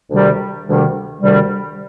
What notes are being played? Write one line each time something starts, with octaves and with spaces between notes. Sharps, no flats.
D2 C3 D#3 G3
D2 C3 D#3 G3
D2 C3 D#3 G3